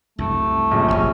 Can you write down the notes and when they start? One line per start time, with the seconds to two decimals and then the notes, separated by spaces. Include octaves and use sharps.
0.18 C2 F#2 A3
0.71 A#1 C#3 G3
0.88 D1 C2 F#3 C#4